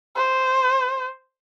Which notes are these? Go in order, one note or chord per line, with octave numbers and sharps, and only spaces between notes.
C5